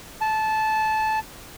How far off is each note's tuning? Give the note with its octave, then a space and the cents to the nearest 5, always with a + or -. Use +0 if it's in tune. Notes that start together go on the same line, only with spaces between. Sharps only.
A5 -15